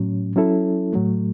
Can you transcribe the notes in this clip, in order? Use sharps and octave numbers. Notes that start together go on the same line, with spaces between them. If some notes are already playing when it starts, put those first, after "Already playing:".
Already playing: A2 F#3 C#4
F#3 C#4 E4 A4
A2 F#3 A3